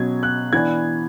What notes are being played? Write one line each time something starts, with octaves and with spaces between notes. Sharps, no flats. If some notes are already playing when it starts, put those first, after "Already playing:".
Already playing: B2 F#3 C#4 G#6
F#6
E3 B3 D4 G#6